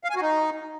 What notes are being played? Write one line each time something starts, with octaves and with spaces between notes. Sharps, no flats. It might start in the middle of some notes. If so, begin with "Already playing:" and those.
F5
G#5
F#4
D#4